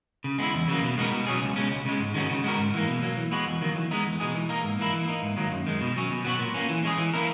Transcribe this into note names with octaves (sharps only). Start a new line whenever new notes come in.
C#3
G#3 B3 E4
E2
C#3 F#3 A#3
B2
G#3 B3 D#4 A#4
B2
F#3 C#4 G#4
C#2
B2 G#3 C#4
C#2
C#3 G#3
G#2
D#3 G#3 C#4 F#4
C#3
G#3 B3 F#4 A#4
G#2
E3 A#3
B2
F#3 A#3
E3
G#3 B3 F#4
E2
D#3 F#3 A#3
E3
G#3 B3 D#4
E2
B2 G#3 D#4 G#4
E3
A#3 D#4 A#4
G#2
E3 A#3 E4
E3
A#3 D#4
G#2
D#3 F#3 A#3
F#2
D#3 G#3
B2
F#3 C#4
B2
F#3 B3 F#4
A#2
A#3 C#4
E3
G#3 C#4 G#4
E3
A#3 C#4 E4 A#4